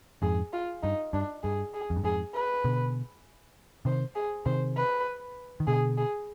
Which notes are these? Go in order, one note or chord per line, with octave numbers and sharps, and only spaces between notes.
F2 G#2 G#4
F4
G2 D#4
G2 D4
G2 G#4
G#4
F2
G2
F2 G#2 G#4
B4
B2 D3
C3 D#3 C5
G#4
C3 D#3 C5
B4
D#3
B2 D3 G#4
G#4